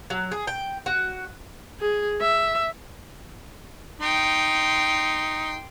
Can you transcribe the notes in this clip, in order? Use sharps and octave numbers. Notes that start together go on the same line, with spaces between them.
F#3
G#4
G5
F#4
G#4
E5
D#4 G5 C6